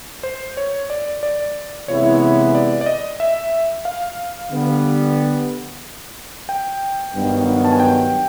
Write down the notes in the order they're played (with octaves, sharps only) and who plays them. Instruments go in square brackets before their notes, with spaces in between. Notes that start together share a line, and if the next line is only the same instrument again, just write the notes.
[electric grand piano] C5
C#5
D5
D5
[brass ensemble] C3 E3 G#3 B3 E4 [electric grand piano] C#5
[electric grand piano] D5
D5
D#5
E5
F5
[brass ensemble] D3 G3 B3
[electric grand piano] G5
[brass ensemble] G2 D#3 F#3 B3
[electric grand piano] A5
G#5
G5